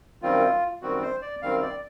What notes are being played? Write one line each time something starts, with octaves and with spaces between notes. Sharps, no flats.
F#2 D#3 G3 C4 F4
F#2 D#3 G3 C4 F#4
C5
D5
F#2 D#3 G3 C4 F5
D5